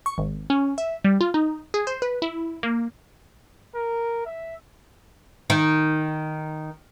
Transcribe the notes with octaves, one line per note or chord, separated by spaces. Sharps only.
C#6
G#1
C#4
E5
G3
F4
D#4
G#4
C5
B4
E4
A#3
A#4
E5
D#3